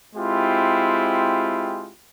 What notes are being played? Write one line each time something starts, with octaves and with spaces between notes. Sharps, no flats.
G#3 C4 E4 F4 G4